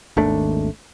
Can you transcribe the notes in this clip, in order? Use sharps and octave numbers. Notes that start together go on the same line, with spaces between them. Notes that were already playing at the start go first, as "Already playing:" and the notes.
G#1 D#2 A3 D4